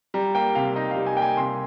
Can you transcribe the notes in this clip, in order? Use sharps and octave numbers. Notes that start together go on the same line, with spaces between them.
G3 A#5
A#3 G5
C3 F5
D#4 D#5
F5
G3
G#5
A#3 G5
G#5
C3 C6